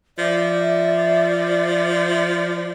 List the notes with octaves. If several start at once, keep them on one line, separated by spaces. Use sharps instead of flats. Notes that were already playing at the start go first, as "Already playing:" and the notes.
F3 D5 E5